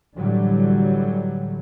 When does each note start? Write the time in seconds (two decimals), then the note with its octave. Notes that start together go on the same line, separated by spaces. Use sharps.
0.19 A2 D3 E3 F#3 G3